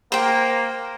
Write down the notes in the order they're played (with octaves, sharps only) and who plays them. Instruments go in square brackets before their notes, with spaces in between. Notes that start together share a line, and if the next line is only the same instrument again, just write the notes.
[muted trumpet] A#3 [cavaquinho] C5 G5